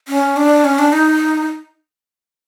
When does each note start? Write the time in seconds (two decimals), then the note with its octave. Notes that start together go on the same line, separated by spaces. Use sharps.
0.08 C#4
0.36 D4
0.65 C#4
0.79 D4
0.93 D#4